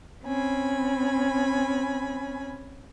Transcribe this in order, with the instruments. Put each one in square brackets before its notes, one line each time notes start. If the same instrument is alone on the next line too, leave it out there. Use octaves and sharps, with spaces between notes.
[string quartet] C4 C#4 G#5 B5